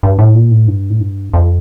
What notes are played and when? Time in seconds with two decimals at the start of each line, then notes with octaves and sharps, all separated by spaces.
0.03 G2
0.19 A2
0.35 A#2
0.51 A2
0.68 G2
0.90 A2
1.00 G2
1.33 F2